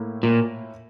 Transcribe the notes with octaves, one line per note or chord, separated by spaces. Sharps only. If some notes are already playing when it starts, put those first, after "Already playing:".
Already playing: A2 A#3 E4
A#2